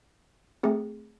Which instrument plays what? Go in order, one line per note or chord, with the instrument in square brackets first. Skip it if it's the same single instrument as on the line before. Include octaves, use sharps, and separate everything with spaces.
[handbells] A3 C4 G#4